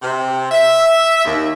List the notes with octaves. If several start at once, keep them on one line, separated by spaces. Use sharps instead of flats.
C3
E5
D#2